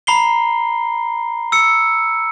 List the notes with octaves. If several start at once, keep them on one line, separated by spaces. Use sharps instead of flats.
A#5 B5 C7 G7
E6 C#7